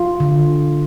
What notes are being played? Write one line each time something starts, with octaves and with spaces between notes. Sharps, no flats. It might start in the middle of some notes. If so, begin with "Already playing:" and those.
Already playing: F4
D3